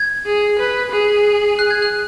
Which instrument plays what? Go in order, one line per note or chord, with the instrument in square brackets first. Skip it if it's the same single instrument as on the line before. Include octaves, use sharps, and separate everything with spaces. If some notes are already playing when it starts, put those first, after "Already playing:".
Already playing: [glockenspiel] G#6
[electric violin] G#4
B4
G#4
[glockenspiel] F#6
G#6
F#6